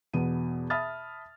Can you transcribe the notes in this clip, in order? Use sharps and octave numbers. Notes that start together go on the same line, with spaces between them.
E2 B2 B3 D#7
E5 A5 B5 D#6 F6 A6